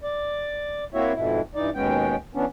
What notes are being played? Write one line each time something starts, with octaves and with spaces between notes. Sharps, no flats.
D5
A#3 C4 E4 F#4 C#5 E5
F2 G#2 B2 E4
G2 E3 D#4 D5
D#2 B2 G#3 B3 C#4 G5
E3 B3 C#4 D4